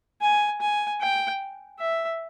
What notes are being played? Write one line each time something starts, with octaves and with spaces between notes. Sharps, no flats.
G#5
G#5
G5
E5